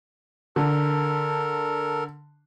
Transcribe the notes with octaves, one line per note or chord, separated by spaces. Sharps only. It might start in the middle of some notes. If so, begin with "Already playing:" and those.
D3 A4 A#4